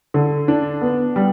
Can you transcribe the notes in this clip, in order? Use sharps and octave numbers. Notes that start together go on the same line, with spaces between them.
D3
D4
B3
G3